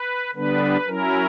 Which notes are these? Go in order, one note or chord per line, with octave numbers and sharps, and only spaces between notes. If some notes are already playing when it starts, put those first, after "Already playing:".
Already playing: B4
D3 G3 B3 D4 B4
F#3 C#4 E4 A#4